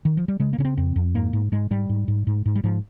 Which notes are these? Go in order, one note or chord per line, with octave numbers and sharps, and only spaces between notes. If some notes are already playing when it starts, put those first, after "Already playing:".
D#3
F3
G3
C#3 G#3
A#3
C#3 C#4
C4
F2 C4
F2
G#2 A#3
G#2
G#2 G#3
G#2 G3
G#2
G#2
G#2
G#2
G3
G#2 F3